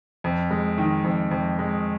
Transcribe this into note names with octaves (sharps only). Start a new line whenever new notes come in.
F2
G#3
D#3
F2
F2
G#3